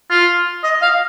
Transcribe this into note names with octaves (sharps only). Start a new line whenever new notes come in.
F4
D#5
F5